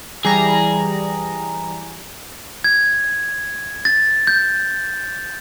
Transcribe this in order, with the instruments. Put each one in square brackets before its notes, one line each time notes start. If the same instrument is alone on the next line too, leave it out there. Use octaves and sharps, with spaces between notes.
[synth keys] E3 G3 A#5 [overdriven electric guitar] G#4
[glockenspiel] G#6
A6
G6